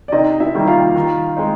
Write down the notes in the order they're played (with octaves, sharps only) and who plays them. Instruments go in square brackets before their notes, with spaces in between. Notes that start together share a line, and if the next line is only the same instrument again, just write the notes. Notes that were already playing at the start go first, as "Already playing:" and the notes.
[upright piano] D5
[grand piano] C3 [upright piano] D#4 D#5
[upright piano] E4 E5
[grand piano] D#3 G3 A#3 D#4
[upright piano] F4 F5
[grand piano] D#3
G#3 C4 D#4